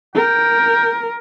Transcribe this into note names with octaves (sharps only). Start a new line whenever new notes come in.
A#4 G5